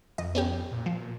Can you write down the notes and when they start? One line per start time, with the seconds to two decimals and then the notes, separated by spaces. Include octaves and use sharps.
0.18 F2 D#5
0.35 B3 C#4 G4
0.71 A#2
0.86 F3